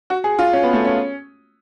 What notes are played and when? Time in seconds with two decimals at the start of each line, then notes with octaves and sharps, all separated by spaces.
0.10 F#4
0.24 G#4
0.39 F4
0.53 C#4
0.63 B3
0.73 A3
0.85 C#4